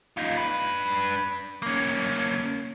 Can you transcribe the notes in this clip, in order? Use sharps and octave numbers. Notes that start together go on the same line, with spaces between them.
D#4 F4
D4 B4
A#3 C#4